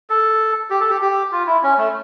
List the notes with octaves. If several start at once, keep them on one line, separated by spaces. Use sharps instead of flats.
A4
G4
A4
G4
G4
F4
E4
C#4
A3